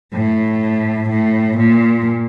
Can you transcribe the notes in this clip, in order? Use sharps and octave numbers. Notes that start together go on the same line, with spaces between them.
A2
A2
A#2